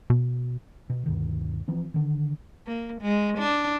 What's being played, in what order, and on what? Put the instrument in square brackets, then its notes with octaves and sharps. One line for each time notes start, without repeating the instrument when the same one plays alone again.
[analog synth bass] B2
[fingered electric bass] B2
D2 G2 B2 D#3
E3 F3 C4
D3 D#3
[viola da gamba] A#3
G#3
D4